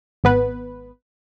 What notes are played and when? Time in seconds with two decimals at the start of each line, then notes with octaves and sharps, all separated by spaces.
0.24 G#1 B3 B4